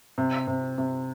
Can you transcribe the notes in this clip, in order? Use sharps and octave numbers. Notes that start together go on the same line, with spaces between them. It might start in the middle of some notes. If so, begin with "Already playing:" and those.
C3
C3
C3